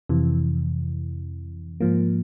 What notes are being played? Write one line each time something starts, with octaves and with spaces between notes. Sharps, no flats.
F2 C3 E3
G#2 F3 A#3